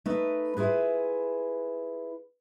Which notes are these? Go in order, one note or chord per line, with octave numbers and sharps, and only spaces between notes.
A3 D#4 B4
E4 F4 G#4 B4